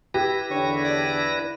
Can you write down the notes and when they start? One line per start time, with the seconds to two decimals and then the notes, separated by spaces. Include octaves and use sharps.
0.14 E4 G4 B4 A#6
0.51 E2 D3 D4 C#5
0.85 D5